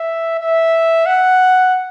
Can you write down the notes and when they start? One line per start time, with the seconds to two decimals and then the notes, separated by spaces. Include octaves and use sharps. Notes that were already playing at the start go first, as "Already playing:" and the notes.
Already playing: E5
0.38 E5
1.06 F#5